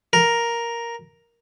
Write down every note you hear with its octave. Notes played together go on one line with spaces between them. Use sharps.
A#4